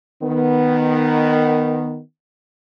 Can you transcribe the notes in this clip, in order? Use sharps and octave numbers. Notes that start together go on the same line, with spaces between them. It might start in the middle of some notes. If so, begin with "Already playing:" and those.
D#3 B3